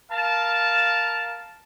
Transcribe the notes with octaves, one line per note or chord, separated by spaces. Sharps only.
A#4 F5 A5